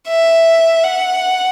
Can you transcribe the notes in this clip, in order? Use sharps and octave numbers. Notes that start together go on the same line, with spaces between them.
E5
F#5